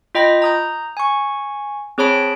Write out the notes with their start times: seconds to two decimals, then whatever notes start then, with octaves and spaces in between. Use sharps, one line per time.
0.15 F4 D#5 G5 B5 A#6
0.42 A#5 D#6 G6
0.97 G#5 C#6
1.98 C4 G#4 C#5 A5 B5 D7